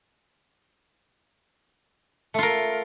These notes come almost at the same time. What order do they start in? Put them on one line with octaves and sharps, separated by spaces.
A3 F4 A#4